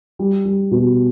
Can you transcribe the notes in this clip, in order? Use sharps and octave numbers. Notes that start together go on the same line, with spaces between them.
G3
G3
B2